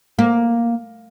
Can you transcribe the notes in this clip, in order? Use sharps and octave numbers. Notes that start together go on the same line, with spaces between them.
A#3